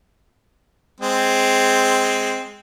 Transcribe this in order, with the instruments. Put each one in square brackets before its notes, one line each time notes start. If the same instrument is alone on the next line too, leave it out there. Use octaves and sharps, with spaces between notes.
[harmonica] G#3 C4